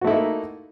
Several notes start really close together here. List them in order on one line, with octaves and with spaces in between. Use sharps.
F#4 A3 E4 D#4 A#3